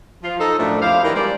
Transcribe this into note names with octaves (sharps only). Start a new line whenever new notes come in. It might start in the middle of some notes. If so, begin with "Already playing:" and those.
F3 F4
D#4 A4
F#2 A2 F3 A3 D4
F2 E4 G4 C5 F5
D#3 E3 E4 G4 A#4 D5
G3 G#3 A#4 C5 D5